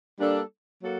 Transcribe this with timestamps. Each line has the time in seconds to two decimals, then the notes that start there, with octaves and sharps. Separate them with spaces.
0.18 G3 A#3 D4 A4
0.82 F#3 A#3 F#4 A4